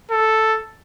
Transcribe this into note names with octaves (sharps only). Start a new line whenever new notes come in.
A4